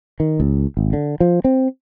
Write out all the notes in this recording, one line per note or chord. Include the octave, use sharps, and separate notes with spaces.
D#3
C#2
G#1
D3
F3
C4